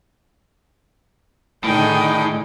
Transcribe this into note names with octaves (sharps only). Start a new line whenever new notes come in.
A2 D3 D#3 D#4 G#4 G5